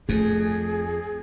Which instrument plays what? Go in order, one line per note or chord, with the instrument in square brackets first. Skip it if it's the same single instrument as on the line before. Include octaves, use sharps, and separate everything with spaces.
[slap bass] F2 [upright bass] A3 [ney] G#4